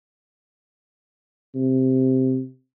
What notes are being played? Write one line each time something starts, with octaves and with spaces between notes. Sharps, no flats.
C3